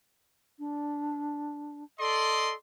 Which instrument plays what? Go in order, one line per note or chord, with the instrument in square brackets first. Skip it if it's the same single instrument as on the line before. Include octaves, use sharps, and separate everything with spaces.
[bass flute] D4
[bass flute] A4 [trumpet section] D5 D#5 C6